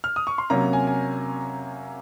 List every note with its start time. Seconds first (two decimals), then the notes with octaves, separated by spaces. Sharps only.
0.04 F6
0.16 D#6
0.27 C#6
0.38 C6
0.50 C3 F#3 A#3 C#4 A#5
0.73 G#5
0.87 G#5